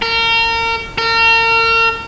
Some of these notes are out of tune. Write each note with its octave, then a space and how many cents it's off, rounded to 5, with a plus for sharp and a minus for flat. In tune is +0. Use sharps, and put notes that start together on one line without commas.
A#4 -30
A#4 -35